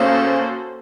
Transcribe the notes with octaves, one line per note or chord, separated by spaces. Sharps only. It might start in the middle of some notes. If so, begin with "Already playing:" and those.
Already playing: C#3 A#3 C#4 F#4 A4 C5